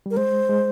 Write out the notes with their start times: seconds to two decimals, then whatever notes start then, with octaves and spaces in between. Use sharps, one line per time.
0.06 G3 A#4
0.17 G#3 C5
0.49 G#3